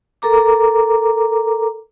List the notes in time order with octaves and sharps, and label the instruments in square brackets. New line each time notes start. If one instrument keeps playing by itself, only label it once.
[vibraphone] A4 A#4 A#5 D6